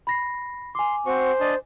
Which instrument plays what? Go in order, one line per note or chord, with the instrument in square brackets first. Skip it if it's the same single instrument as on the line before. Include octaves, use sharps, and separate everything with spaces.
[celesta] B5 A#6 C7
[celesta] G#5 D6 [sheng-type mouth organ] C6
[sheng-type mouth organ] C4 F#4 C#6 [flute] C5
[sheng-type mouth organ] D4 D#5 A5